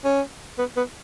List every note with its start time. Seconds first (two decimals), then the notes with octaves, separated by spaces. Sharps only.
0.04 C#4
0.58 B3
0.77 B3